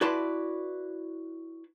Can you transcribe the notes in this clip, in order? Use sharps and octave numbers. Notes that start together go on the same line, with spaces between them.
E4 F#4 B4 D5 A5 C6